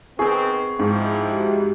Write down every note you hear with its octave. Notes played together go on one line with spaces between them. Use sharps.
D#3 B3 C4 G#4 C#6
G#2 F3 C4 E4
F#4 G4